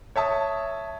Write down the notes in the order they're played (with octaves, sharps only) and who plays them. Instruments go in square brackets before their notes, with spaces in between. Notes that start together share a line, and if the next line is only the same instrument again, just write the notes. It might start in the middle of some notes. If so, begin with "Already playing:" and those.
[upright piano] C#5 E5 A5 D#6